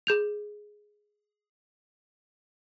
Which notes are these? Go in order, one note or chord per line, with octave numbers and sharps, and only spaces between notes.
G#4 G6 F7